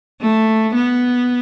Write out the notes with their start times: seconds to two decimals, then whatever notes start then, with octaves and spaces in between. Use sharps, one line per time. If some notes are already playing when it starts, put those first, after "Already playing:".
0.21 A3
0.75 B3